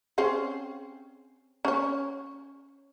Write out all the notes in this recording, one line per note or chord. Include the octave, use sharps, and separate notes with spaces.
C4 C#4 G#4
C#4 C#5